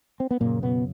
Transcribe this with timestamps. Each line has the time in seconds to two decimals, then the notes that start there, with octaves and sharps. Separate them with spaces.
0.20 C4
0.31 B3
0.40 F#2 A#2 C#3 A#3
0.63 B2 B3